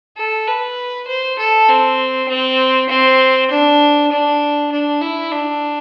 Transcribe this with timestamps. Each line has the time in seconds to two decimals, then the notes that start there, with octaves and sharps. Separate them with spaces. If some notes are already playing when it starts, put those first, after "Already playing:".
0.17 A4
0.47 B4
1.08 C5
1.39 A4
1.69 C4
2.29 C4
2.89 C4
3.51 D4
4.12 D4
4.72 D4
5.02 E4
5.32 D4